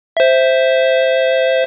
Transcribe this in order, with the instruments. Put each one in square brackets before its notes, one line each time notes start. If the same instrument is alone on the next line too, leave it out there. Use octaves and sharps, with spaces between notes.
[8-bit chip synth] C5 E5